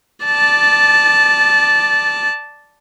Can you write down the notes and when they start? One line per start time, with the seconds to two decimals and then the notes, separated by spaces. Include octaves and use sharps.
0.25 D5 A5